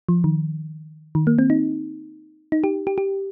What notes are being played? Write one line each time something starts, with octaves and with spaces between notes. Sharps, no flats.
F3
D#3
D#3
A#3
C4
D#4
D#4
G4
G4
G4